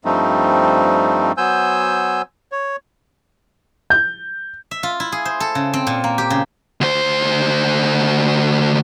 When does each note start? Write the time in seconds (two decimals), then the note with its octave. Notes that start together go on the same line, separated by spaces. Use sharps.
0.05 G2 F3 G3 A3 C4 D#4
1.37 F#3 B3 C5 G#5 E6 G6
2.52 C#5
3.90 G6
4.71 E5
4.83 F4
5.00 E4
5.12 G#4
5.25 C5
5.40 A4
5.55 C#3
5.73 C4
5.87 A#2
6.04 A#3
6.18 G4
6.30 C#3
6.81 D2 C5